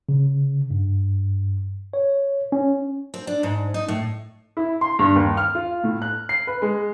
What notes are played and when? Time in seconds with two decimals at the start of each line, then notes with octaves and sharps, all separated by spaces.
0.09 C#3
0.71 G2
1.94 C#5
2.52 C#4
3.14 C4
3.27 D4
3.43 G#2
3.74 D#4
3.88 A2
4.57 E4
4.81 C6
4.99 G2
5.16 D#2
5.37 F6
5.55 F4
5.84 A2
6.02 F#6
6.29 C7
6.47 B4
6.62 G#3